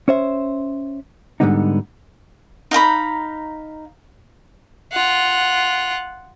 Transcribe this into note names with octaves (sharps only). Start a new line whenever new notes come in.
C#4 C5 E5
G#2 D3 D#3 G3 B3 D#4
D#4 F5 A#5 B5
F4 F#5